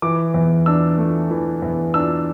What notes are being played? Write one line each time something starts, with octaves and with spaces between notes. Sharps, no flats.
E3 D6
E2
D4 E6
A3
E3
E2
D4 E6